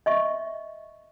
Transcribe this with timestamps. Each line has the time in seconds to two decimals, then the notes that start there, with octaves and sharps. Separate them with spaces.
0.06 D#5 E5 C#6